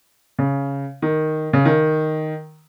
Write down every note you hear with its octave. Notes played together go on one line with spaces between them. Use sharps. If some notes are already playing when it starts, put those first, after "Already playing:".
C#3
D#3
C#3
D#3